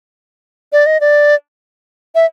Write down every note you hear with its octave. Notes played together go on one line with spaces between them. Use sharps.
D5
D#5
D5
E5